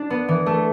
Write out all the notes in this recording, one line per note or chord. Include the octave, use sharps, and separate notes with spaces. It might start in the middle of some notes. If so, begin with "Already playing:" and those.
Already playing: D4
B3
E3
A3